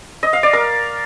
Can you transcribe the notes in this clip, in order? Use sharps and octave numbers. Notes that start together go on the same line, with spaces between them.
D#5
F5
D5
A#4